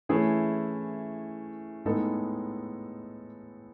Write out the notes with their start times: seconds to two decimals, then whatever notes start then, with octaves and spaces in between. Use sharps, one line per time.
0.09 E3 A3 C#4 E4 G#4
1.86 A2 G#3 B3 D#4 A4